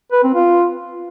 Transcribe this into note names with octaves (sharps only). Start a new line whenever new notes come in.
B4
C4
F4